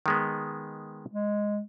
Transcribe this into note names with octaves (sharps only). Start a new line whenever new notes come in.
D#3 G#3 B3
G#3